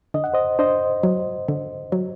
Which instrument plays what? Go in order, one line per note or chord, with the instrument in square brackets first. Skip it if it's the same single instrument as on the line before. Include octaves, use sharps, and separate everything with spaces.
[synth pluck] D3 [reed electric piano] D#5
[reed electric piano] F#5
C5 D#5
[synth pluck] D4 [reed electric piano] C5 D#5
[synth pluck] F#3
D3
F#3